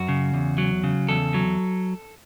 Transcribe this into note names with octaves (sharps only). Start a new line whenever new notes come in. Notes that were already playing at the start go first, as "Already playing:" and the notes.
Already playing: F#2 F#4
C#3
E2
F#3
C#3
E2 A4
F#3